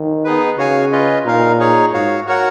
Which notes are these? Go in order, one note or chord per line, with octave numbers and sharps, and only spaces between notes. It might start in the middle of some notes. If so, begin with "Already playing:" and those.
Already playing: D#3
B3 D#4 G#4 B4
C#3 F#4 C#5 F5 G#5
C#4 F4 B4 D#5
A#2 D#4 A#4 F5
D#4 G#4 C#5
G#2 F#4 C#5 F5
F#4 A#4 C#5 F#5